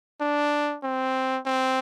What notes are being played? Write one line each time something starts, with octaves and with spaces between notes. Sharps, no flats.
D4
C4
C4